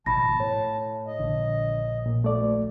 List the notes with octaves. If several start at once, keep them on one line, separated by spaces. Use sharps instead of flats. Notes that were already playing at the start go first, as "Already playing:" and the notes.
G#1 B2 F3 A5 B5 A#6
A2 C#5
D#5
A#1 D3
A#2
D2 A3 D5